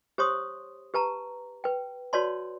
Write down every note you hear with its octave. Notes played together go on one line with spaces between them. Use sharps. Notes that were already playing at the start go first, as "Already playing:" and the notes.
G4 C5 C#5 C6 D#6
G4 B4 A5 A#5
B4 G5
F#4 B4 C#5 D5 A5 C6